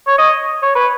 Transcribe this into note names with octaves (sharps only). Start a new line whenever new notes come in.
C#5
D#5
C#5
B4